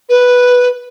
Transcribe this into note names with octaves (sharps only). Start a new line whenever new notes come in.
B4